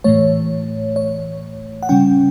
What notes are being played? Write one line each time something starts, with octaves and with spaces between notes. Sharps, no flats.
A2 E3 A3 C#5
C#5
F#5
C#3 G3 C#4 G5